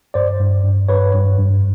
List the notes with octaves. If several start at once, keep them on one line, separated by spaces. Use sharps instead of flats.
G2 C5 D5
G2
G2
G2 B4 C#5
G2
G2